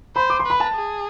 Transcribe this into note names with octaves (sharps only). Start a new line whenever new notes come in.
C5 B5
D6
C6
B4 B5
A5
G#4